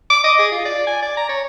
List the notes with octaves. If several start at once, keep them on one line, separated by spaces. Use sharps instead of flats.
D6
D#5
G#4
F4
D5
G#5
D5
A#5
C#5